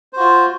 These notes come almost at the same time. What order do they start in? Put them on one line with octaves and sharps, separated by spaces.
C5 F#4 F4